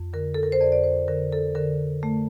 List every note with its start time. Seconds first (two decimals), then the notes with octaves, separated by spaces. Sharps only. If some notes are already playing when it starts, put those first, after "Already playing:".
Already playing: F2
0.13 D3 A#4
0.34 A4
0.43 A#4
0.52 C5
0.60 F2 D5
0.72 D5
0.84 C5
1.08 D3 A#4
1.32 A4
1.55 D3 A#4
2.03 A3